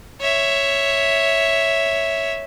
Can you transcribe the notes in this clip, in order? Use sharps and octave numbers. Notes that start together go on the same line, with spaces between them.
C#5 E5